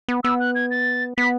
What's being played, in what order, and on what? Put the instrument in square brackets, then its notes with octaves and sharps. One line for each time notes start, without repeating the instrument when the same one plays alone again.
[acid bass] B3
[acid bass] B3 [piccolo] E6
[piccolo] F#6
G#6
A6
[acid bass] B3 [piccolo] B6